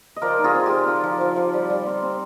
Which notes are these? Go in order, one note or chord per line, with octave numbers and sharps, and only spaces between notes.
D#5
F3 A#4 D5
D#4
F4 G#4
C4
C4 G4
F3
F3
F3
F3
G3
G3
C4
C4